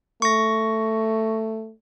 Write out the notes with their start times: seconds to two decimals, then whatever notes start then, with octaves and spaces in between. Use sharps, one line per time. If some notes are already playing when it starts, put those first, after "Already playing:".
0.22 A3 C#6 A#6